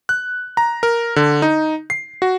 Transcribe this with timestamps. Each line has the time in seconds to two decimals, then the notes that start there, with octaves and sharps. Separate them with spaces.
0.09 F#6
0.57 A#5
0.83 A#4
1.16 D3
1.42 D#4
1.90 C7
2.22 F#4